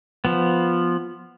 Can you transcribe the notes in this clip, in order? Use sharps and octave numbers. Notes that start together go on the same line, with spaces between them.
F3 B3